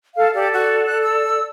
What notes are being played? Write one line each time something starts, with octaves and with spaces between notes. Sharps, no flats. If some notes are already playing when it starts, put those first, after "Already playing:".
A4 F5
G4 A4 D5
F#4
F#6
E6